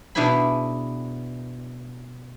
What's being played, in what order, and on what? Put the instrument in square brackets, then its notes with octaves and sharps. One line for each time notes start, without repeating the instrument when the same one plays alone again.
[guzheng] B2 D4 E4 G#4 G#5 B5